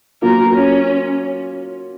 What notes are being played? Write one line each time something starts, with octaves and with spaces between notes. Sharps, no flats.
F#3 A#3 F4 A#4
C#4